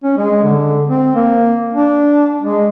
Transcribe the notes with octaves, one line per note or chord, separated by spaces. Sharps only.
C#4
G#3
D3
C4
A#3
D4
G#3